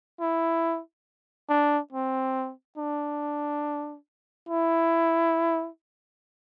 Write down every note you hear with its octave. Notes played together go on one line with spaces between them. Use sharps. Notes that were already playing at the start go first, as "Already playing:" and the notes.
E4
D4
C4
D4
E4